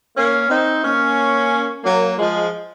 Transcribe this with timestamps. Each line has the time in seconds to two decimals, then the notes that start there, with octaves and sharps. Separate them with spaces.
0.16 A#3 C#4
0.49 C4 D#4
0.83 A#3 C#4
1.84 F#3 A#3
2.17 F3 G#3